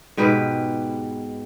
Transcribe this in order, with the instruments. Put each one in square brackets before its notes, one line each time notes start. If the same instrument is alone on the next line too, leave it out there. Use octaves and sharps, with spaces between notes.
[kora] G#2 B2 G4 B4